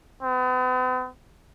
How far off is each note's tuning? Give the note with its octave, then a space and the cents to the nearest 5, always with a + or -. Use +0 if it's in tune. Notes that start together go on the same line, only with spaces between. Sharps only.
B3 +45